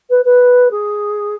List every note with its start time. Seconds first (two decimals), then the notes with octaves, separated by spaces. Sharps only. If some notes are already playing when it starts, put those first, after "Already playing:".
0.10 B4
0.24 B4
0.71 G#4